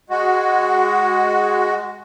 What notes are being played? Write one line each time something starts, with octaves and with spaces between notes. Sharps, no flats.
G#3 F#4